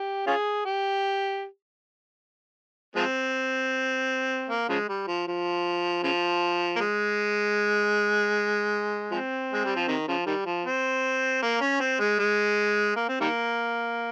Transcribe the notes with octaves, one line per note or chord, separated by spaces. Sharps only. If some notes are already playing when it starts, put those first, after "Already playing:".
Already playing: G4
C#4 F4 G#4
G4
F3 G#3 C4
A#3
C#3 F3 G#3
G3
F3
F3
C#3 F3
A#3
G#3
F3 G#3 C4
G#3
G3
F3
C3 D#3
C#3 F3
D#3 G3
F3
C4
A#3
C#4
C4
G#3
G#3
A#3
C4
D#3 G3 A#3